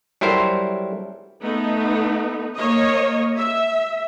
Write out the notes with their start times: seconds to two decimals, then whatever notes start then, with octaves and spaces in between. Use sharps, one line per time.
0.21 F#3 G3 E4 A4 A#4 C5
1.42 A3 B3 D#4
2.57 A#3 C#5 D#5
3.36 E5